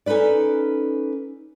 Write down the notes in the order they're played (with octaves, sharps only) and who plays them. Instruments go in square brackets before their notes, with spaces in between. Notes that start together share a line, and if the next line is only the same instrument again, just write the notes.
[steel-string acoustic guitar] C#4 D#4 A4 B4 D5